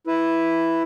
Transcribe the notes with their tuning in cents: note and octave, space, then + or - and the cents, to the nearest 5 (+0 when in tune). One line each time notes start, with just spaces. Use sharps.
E4 +0 B4 +0